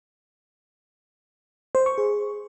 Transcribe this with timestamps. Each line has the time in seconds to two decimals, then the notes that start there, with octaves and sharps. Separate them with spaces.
1.75 C5
1.86 C#6
1.98 G#4